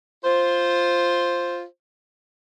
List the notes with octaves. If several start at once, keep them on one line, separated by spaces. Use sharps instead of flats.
F4 C5